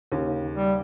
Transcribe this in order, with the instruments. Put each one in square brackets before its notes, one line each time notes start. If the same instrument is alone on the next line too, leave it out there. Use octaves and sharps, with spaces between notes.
[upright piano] D#2 C#3
[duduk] G3